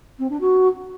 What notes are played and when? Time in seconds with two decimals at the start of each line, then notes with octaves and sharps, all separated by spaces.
0.19 C4
0.29 D4
0.40 F#4